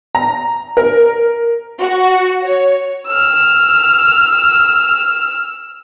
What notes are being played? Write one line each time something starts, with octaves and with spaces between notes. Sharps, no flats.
A#5
A#4
F#4
C#5
E6 F6